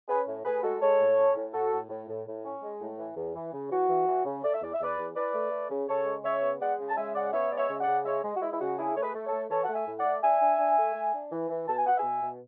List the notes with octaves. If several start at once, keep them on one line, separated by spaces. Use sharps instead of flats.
C#4 G#4 B4
A2
A2 G#4 B4
G#3 F#4 A4
G#3 A4 C#5
A2
C#4
A2
A2 F#4 A4
A2
A2
A2
A2
C#4
G#3
A2
E3
E2
E3
C#3
E3 F#4
E3
E3
C#3
A3 D5
E5
E2 D5
E5
E2 B4 D5
E2
E3 B4 D5
A3
A3
C#3
C#3 A4 C#5
G#3
C#3 C#5 E5
B3
G#3 D5 F#5
C#3
A5
G#3 E5 G#5
C#3 D5 F#5
B3 C#5 E5
G#3 D5
C#5 E5
C#3
D5 F#5
C#3
G#3 C#5 E5
G#3
F#4
G#3 E4
E4
C#3 F#4
D4 E4 G#4
A3 C#5
G#4 B4
A3
A4 C#5
A3
E3 A4 C#5
F#5
A3
E5 G#5
A2
D5 F#5
A3
D4 E5 G#5
D4
D4
A3
A3
D4
E3
E3
B2 A5
G#5
B3 F#5
E5 G#5
B2
B2